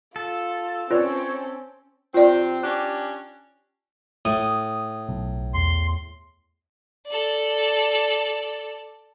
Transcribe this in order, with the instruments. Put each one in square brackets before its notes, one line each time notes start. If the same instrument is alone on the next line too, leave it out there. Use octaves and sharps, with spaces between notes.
[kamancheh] F4 [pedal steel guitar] A4
[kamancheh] C4 C#4 [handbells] F4 B4 D5 [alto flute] C#5
[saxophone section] C3 C4 [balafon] F4 D5
[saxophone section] C#4 D4 G4
[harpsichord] A2 [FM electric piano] D#6
[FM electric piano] B1
[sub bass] E2 [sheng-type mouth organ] C6
[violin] A4 D5